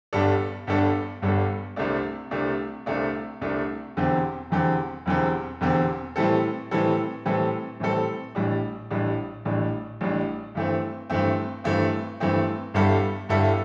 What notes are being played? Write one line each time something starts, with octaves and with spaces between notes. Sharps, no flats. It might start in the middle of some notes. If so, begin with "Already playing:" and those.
G1 G2 G3 D4 A4
G1 G2 G3 D4 A4
G1 G2 G3 D4 A4
C2 C3 A3 D4
C2 C3 A3 D4
C2 C3 A3 D4
C2 C3 A3 D4
E1 E2 D3 C4 G4
E1 E2 D3 C4 G4
E1 E2 D3 C4 G4
E1 E2 D3 C4 G4
A2 E3 G3 C4 A4
A2 E3 G3 C4 A4
A2 E3 G3 C4 A4
A2 E3 G3 C4 A4
A1 A2 G3 D4
A1 A2 G3 D4
A1 A2 G3 D4
A1 A2 G3 D4
G2 E3 A3 C4
G2 E3 A3 C4
G2 E3 A3 C4
G2 E3 A3 C4
G1 G2 G3 E4 A4
G1 G2 G3 E4 A4